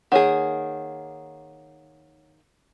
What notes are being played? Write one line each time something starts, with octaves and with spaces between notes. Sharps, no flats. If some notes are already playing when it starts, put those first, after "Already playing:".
D#3 A#3 G#4 C#5 F#5